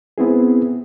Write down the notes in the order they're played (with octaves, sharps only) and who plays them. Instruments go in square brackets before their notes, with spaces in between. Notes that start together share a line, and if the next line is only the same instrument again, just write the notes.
[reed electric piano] B3 C4 E4 G#4